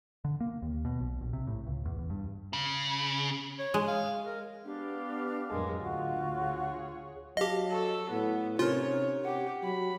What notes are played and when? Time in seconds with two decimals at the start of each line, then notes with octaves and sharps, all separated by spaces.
0.25 D3
0.40 A#3
0.62 D#2
0.85 B2
1.00 B1
1.21 A#1
1.33 C3
1.47 A2
1.67 C#2
1.85 E2
1.99 E2
2.10 G2
2.53 C#3
3.59 C#5
3.74 G#3
3.88 F5
4.26 A#4
4.64 B3 D4 G4 F5
5.51 F2 A2 F#3 G#3 A#4
5.82 D2 F4 F#4
6.33 G#4 C#5
7.37 F#3 G4 D#5 F5 A5
7.72 A4 A5 C#6 E6
8.11 A2 B3
8.59 C3 C#4 D#4 F4 A#4 C#5
9.25 G4 F#5
9.64 F#3 B5